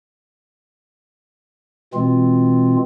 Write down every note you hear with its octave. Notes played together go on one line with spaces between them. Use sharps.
B2 E3 G#3 C4 F4